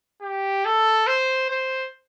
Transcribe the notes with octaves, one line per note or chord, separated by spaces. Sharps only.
G4
A4
C5
C5